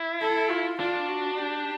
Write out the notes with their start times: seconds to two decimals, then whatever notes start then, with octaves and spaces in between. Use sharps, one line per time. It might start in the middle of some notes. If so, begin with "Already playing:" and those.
Already playing: E4
0.21 A4
0.50 F4
0.79 D4 F4
1.08 F#4
1.37 G4